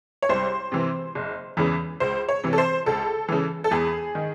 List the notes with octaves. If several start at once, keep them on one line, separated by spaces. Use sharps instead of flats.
C#5
C2 C5
C3 E3
F#1
E2 C#3 E3
C#2 C5
C#5
C3 E3
A4
C5
C#2 A4
C#3 E3
A4
E2 G#4
D#3